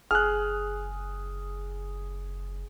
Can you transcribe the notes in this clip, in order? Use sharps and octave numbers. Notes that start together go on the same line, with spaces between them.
F#1 G#4 F6 F#6